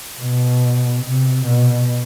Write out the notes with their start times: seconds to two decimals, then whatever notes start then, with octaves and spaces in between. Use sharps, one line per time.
0.20 B2
1.04 C3
1.47 B2